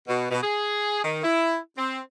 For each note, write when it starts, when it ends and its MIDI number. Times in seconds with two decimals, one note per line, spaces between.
0.08 0.28 47
0.30 0.42 47
0.42 1.01 68
1.04 1.21 51
1.22 1.57 64
1.78 1.99 60